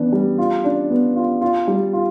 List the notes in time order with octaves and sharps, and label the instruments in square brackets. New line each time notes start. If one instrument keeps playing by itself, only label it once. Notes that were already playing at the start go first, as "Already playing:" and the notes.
Already playing: [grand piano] E3 B3 D4
G3
F4
D4
B3
F4
F4
G3
F4